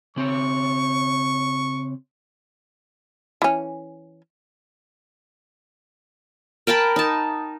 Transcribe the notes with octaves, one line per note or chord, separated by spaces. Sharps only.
C#3 C4 C#5 C#6
E3 C#4
A#4 G5 A5 B5
D#4 A5